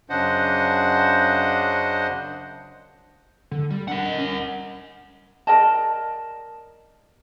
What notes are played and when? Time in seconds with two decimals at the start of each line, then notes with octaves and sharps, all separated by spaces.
0.10 F#2 C#3 D4 C5 D#5 F#5
3.51 D3
3.70 G3
3.88 D4 A#4 F#5
4.05 D#5
4.18 C#4
5.47 A#4 D5 D#5 A5